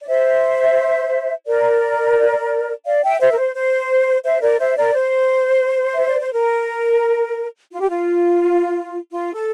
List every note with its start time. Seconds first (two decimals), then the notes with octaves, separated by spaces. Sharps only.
0.03 D5
0.08 C5 E5
1.47 A#4 D5
2.85 D5 F5
3.03 E5 G5
3.20 C5 E5
3.32 A#4
3.38 C5
3.56 C5
4.24 C5 E5
4.41 A#4 D5
4.59 C5 E5
4.77 A#4 D5
4.94 C5
5.94 E5
6.07 D5
6.21 C5
6.33 A#4
7.72 F4
7.81 G4
7.89 F4
9.11 F4
9.33 A4